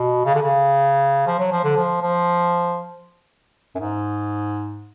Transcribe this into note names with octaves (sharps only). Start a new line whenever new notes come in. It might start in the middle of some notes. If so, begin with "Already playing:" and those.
Already playing: B2
C#3
D3
C#3
F3
F#3
F3
D3
F3
F3
F#2
G#2